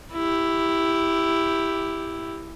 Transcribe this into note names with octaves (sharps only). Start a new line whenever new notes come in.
E4 G4